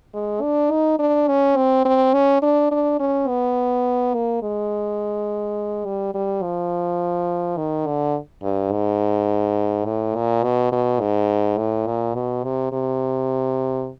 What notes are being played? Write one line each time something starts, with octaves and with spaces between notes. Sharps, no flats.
G#3
D4
D#4
D4
C#4
C4
C4
C#4
D4
D4
C#4
B3
A#3
G#3
G3
G3
F3
D#3
D3
G2
G#2
A2
A#2
B2
B2
G#2
A2
A#2
B2
C3
C3